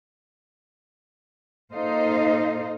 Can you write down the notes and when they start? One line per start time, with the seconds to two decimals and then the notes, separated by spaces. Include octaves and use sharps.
1.74 A#2 D#4 A4 C5 D#5 F5